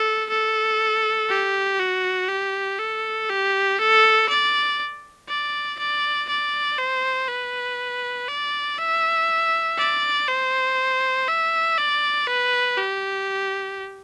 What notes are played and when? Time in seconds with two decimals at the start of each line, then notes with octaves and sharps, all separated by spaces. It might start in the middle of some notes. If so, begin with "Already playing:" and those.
Already playing: A4
0.30 A4
1.29 G4
1.79 F#4
2.29 G4
2.79 A4
3.29 G4
3.79 A4
4.29 D5
5.29 D5
5.79 D5
6.29 D5
6.78 C5
7.28 B4
8.28 D5
8.78 E5
9.78 D5
10.28 C5
11.28 E5
11.78 D5
12.27 B4
12.77 G4